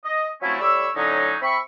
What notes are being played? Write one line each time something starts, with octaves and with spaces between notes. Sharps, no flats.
D#5
F3 F#3 A3 C4 C#4 E4
A2 G3 C#5 B5 D6 E6
A2 D3 F#3 C#4 D#4
C4 E5 B5 C#6